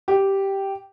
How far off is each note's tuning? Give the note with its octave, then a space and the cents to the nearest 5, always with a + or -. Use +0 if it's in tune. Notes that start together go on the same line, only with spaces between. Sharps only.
G4 -5